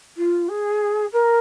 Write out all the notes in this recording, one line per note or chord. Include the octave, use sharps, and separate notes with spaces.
F4
G#4
A#4